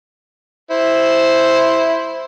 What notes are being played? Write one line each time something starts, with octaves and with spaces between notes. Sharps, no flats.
E4 C5